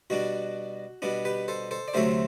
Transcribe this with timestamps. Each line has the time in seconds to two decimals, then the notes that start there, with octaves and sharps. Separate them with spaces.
0.10 B2 G3 D4 F#4
1.02 B2 G3 B3 D4
1.25 G4 B4
1.48 A4 C5
1.71 A4 C5
1.88 D5
1.94 D2 C3 F#3 A3 C4 C5 E5